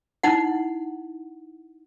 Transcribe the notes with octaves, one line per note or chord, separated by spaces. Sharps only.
D#4 E4 F#5